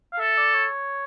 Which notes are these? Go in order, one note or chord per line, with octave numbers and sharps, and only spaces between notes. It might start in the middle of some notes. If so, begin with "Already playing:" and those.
F5
A4 E5
D5
C#5